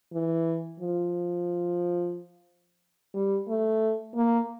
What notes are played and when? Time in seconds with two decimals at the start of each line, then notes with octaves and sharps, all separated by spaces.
0.13 E3
0.80 F3
3.14 G3
3.48 A3
4.16 A#3